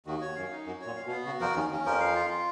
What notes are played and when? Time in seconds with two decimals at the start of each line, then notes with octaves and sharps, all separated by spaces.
0.06 D#2 D#3 F#4
0.21 C#5
0.36 F#2 F5
0.51 D#4
0.66 F#2 F#4
0.81 A#2 C#5
0.96 F5
1.06 B2
1.11 B3
1.26 C#3 F#4
1.41 F2 F3 A#4
1.55 D#2 D#3 C#4
1.71 D#2 D#3 C#4
1.85 F2 F3 A#4
2.00 F5
2.15 F4
2.30 F4